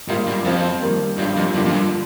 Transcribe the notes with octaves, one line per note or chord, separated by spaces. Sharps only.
G#2 G3 A#3 F4
G2
F2 F3 C4 F4
D#3 G3 A#3
G2 G3 D4 F4
F2
G2 D3 F3 A#3 F4
F2
G2